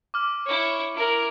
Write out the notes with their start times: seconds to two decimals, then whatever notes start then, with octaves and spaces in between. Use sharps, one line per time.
0.14 D6 F6
0.46 E4 C#5
0.95 E4 A#4